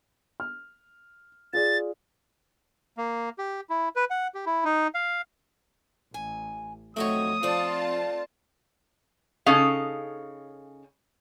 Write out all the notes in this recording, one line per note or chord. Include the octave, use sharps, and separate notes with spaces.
F6
F4 G#4 D5 A6
A#3
G4
E4
B4
F#5
G4
E4
D#4
F5
A1 G#5
F2 D#3 F#3 A3 C4 C#5 D#6
F3 A3 C4 F4 D5 A5
C#3 C#4 D#4 A4 F5